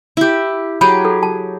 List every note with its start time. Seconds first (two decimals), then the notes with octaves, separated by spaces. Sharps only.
0.17 E4 G4
0.81 F#3 G4 G#4 B5
1.05 A4
1.23 A5